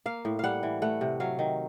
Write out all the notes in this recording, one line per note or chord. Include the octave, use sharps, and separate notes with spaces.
A#3 F5
A2
G3 F5 F#5
E3
A3 F#5
C3
F#3 F5
D#3